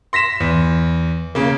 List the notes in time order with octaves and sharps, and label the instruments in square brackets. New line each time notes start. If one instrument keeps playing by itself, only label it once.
[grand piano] C6 A#6 B6 E7
E2
C#3 A#3